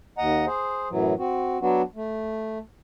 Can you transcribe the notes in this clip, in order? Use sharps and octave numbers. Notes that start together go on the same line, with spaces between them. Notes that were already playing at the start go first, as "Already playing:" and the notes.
D#2 D#5 F#5 A#5
G#4 C5
F#2 A2 E3 F#3
C4 F#4
F#3 B3 D4 F#4
A3